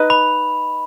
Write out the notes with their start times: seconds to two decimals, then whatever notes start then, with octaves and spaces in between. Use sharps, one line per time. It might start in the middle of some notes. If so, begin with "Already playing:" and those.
Already playing: D#4 B4 D#5
0.10 B5